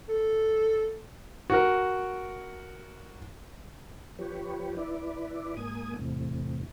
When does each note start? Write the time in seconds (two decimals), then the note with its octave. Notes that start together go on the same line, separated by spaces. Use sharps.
0.09 A4
1.50 F#4 A#4
4.19 F3 G4 B4 C#5
4.77 E4 B4 D5
5.57 G#2 A#3 G#5 D#6
5.99 E2 A2 C3